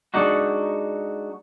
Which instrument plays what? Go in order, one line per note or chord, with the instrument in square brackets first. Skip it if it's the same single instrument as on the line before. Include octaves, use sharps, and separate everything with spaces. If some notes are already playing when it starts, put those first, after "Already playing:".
[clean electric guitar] G#3 D4 D#4 F#4